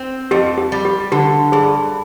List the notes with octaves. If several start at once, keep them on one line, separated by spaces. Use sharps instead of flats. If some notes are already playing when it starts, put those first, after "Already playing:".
Already playing: C4
F2 G4
G4
G3
G4
D3 G4
G2 G#4